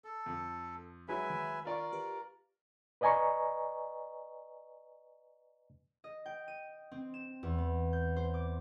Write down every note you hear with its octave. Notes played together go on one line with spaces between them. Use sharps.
A4
F2
F#3 G#3 E4 B4 E5 G#5
D#3
F4 A#4 D5 C#6
G4 B4
B4 D5 D#5 G#5 A#5 C#6
D#5
G5
D#7
C4
E7
E2
B3
G6
C5
D6